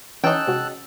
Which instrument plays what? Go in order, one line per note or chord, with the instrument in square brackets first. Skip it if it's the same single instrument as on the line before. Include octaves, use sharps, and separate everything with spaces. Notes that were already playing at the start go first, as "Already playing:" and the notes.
[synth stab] E3 [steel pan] C#4 [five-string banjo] D#4 G5 [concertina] A5 E6 F#6
[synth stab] C3 G#3 F#4